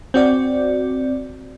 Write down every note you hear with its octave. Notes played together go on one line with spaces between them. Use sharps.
C4 F#4 D5